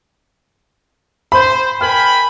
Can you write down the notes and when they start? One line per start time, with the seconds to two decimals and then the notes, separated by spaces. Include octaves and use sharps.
1.32 C5 B5
1.81 A#4 G5 G#5 B5 F6